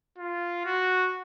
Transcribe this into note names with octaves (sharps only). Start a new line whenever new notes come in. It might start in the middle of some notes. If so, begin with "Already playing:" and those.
F4
F#4